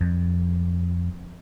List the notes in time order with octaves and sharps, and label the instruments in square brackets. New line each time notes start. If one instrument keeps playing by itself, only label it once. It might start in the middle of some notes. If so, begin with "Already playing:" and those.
[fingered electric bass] F2